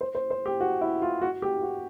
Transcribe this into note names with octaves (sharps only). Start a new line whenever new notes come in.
C5
C5
C5
G4
F#4
E4
F4
F#4
G4
F#4